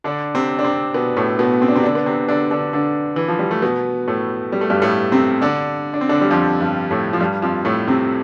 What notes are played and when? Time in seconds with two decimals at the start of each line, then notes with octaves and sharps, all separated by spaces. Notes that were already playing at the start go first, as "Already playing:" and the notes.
0.04 D3 D4
0.34 C3 C4
0.59 D4
0.64 C3 C4
0.94 B2 B3
1.17 A2 A3
1.39 B2 B3
1.62 C4
1.68 D4
1.76 C3 C4
1.83 D3 D4
1.95 B3
2.06 C3 C4
2.28 D3 D4
2.51 D3 D4
2.73 D3 D4
3.16 E3
3.28 F3
3.39 G3
3.51 A3
3.62 B2 B3
4.08 A2 A3
4.52 G3
4.61 A3
4.70 G2 G3
4.82 A2 A3
5.12 C3 C4
5.42 D3 D4
5.94 D4
6.01 C4
6.09 D3 D4
6.21 G3
6.31 F2 F3
6.61 G2 G3
6.90 A2 A3
7.13 F3
7.20 G2 G3
7.42 F2 F3
7.65 A2 A3
7.88 C3 C4